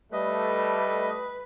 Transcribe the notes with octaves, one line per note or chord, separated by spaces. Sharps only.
G3 A3 B4 D#5